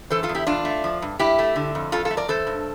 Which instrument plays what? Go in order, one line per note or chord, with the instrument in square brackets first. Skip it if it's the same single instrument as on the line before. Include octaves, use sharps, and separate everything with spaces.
[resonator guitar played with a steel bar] E3 A4 C5
F4 A4
E2
E4 G4
E2 D4 F4
A3
F3
G2
G2 E4 G4
A3
D3
F2
F2 F4 A4
F4 A4
A3
A#4 D5
E3 A4 C5
G2